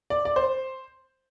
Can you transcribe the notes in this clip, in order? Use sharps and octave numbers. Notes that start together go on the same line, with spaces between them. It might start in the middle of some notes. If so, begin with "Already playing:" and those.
D5
D5
C5